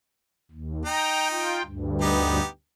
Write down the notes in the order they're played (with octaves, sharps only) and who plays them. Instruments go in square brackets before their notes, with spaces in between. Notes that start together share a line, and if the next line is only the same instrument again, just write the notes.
[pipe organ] D#2
[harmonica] D#4 [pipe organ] G5 A#5
[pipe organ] F4 G5
D2 G2
[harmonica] B3 D#4 G4